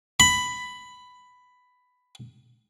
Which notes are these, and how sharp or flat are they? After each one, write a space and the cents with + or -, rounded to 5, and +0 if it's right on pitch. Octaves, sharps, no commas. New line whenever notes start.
B5 +10